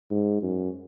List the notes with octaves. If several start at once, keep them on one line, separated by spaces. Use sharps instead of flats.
G#2
F#2